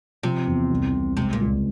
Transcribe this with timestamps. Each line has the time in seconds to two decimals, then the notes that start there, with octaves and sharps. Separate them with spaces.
0.23 C3 F3
0.47 E2
0.70 C2
0.94 C2
1.17 C3 G#3
1.33 A#2
1.41 C#2